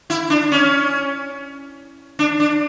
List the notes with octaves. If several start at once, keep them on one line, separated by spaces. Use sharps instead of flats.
E4
D4
C#4
D4
D4